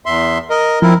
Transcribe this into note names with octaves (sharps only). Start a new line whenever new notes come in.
E2 E5 C6
A#4 D#5
F3 C4 E4 A#4